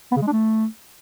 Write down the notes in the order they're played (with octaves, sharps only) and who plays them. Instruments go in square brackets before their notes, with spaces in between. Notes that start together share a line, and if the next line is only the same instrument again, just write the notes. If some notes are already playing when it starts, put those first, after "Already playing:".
[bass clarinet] B3
C#3
G#3
D4
A3